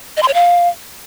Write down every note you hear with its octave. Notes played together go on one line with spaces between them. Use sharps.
D#5
C6
C#5
F5